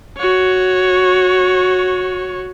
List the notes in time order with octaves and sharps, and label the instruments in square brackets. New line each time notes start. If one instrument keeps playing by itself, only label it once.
[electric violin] F#4 C#5